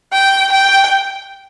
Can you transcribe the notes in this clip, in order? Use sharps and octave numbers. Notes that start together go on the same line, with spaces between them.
G5
G5